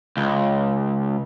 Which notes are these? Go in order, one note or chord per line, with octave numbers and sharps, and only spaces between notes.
C#2